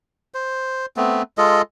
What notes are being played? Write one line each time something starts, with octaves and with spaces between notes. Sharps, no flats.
C5
A3 B3 C4
G#3 F4 A4 D#5